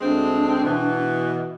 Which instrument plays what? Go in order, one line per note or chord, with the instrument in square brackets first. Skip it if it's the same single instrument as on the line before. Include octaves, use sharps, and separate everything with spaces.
[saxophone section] D2 G#3 C4 [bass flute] D4
[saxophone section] B2 E3